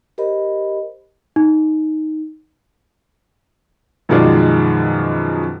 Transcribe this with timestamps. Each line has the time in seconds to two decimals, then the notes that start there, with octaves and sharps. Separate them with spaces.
0.18 G4 A#4 C5 D#5 B5
1.36 D#4
4.09 F#2 B2 D#3 F3 G#3 D5